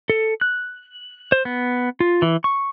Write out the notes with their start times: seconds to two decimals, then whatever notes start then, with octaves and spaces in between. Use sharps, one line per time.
0.10 A4
0.41 F#6
1.32 C5
1.45 B3
2.00 F4
2.22 E3
2.44 C#6